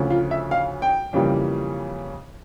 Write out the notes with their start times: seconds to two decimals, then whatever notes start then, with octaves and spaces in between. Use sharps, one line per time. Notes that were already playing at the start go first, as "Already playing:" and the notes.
Already playing: D2 C#3 F3
0.10 F4
0.31 E5
0.51 F5
0.82 G5
1.13 F2 C#3 E3 G3 A#3